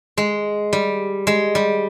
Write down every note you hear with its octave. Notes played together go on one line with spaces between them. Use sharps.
G#3
G3
G#3
G3